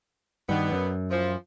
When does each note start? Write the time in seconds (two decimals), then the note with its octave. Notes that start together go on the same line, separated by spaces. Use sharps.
0.49 G2 B2 D3 D#3 B3
0.72 F#2
1.10 E3 F3